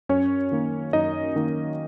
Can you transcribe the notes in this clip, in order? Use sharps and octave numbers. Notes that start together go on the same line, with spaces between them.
F#2 C#4 C#5
D#3 A#3 D#4
F#2 D#4 D#5
D#3 A#3 D#4